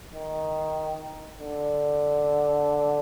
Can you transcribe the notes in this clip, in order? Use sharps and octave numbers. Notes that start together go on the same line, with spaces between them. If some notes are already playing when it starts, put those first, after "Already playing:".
D#3
D3